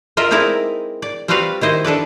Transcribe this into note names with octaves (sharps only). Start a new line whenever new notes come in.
F4 A#4 D#5 E5
G#3 C4 D#4 E4 A#4 D5
D5
G3 C4 F4 F#4 B4 F5
D#3 E4 C5 D#5
D4 A4 B4 D5